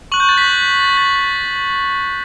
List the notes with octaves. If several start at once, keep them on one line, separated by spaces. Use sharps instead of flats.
C#6 F#6 F#7
G6
A6
B6
A6
A6
A6